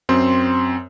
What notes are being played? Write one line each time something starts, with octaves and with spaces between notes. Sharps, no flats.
F#2 C4 C6